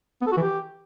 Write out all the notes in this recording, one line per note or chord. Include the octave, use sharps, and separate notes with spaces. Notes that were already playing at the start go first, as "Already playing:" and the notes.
B3
A4
F#4
E3
G4